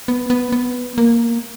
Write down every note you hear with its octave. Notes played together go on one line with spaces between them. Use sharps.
B3
B3
B3
A#3